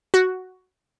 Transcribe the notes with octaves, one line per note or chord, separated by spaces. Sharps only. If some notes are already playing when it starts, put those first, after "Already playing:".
F#4